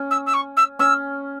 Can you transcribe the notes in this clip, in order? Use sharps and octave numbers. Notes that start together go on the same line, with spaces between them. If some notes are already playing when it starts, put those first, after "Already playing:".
Already playing: C#4
E6
E6
C#6
E6
C#4 E6